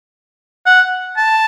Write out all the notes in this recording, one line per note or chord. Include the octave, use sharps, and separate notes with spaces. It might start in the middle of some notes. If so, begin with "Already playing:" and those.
F#5
A5